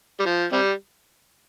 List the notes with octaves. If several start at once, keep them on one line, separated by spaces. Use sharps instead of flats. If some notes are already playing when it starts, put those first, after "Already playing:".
G3
F3
C3 G3